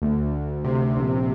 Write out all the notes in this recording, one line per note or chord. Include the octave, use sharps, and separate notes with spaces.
D2
D2
C3
A#1